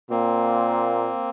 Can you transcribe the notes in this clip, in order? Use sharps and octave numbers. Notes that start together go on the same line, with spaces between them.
A#2 A#3 C4